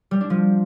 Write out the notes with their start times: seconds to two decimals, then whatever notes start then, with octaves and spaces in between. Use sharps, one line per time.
0.11 G3
0.21 D4
0.30 F3